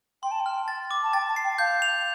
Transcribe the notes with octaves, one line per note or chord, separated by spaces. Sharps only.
G5 C6
A5
G5
F6
A6
D6
A5
G5 A6
A5
C7
G5
F5 G6
F7